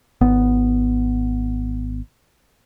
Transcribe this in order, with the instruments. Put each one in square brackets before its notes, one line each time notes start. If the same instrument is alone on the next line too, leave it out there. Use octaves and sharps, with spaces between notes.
[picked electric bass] G#1 B3